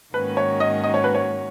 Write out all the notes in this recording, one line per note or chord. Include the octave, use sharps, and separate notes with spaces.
G#2 D#3 A#3 C#4 F#4 B4
C#5
D#5
D#5
C#5
B4
C#5